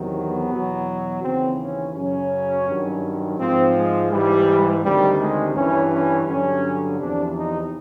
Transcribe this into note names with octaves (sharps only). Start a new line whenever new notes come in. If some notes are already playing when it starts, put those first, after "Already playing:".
Already playing: E2 C3 D#3 F#3
B3
E2 B2 F#3
D#2 C#3 E3 C4
C#4
F#2 C#3 F#3 C#4
G2 D#3 F#3
G#2 F3 C4
G#3
G#2 E3 G3
D2 C3 D#3 G3
G#3
G2 E3 C#4
C#4
G2 D3 F#3 C#4
E2 C3 F3 D4
D#4